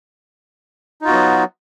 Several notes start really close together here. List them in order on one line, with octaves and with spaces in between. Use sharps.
D#4 F4 F#4 B3 F#3